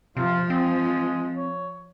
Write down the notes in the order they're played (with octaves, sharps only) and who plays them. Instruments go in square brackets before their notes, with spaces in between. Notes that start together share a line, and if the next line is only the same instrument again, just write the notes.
[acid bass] C3 [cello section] F3 [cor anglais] F4
[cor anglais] G#3 [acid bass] C4
[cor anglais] C#5